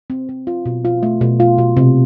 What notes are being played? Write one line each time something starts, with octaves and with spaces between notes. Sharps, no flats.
C4
C4
F4
B2
F4
A3
B2
F4
B2
C3